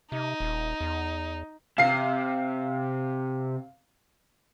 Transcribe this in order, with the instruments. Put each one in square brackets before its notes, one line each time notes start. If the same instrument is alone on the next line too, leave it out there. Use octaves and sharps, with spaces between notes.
[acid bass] C3 [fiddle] D#4
[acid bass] D#1
E2
[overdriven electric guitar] C3 [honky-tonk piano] F5 C7